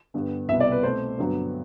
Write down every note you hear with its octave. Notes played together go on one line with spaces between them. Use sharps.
G2 D3 G3 B3
C2 B2 G3 B3 E5
D5
B4
B2 A3 C4 C5
G2 D3 F#3 B3